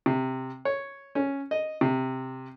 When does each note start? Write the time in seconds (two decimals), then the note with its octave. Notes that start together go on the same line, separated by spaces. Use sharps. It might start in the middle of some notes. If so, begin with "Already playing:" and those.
0.06 C3
0.65 C#5
1.15 C#4
1.51 D#5
1.81 C3